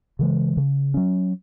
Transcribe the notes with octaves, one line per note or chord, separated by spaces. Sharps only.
C#3 E3 G#3
C#3
F#3 C#4